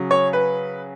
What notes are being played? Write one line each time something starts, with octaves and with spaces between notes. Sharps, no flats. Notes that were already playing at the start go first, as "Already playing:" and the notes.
Already playing: C#3 F#3
C#5
B4